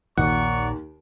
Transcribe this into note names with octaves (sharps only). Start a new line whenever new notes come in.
A#1 D#2 A#2 D5 F#5 A#5 C#6